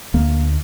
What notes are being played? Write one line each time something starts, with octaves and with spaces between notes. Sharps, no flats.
D2 A#3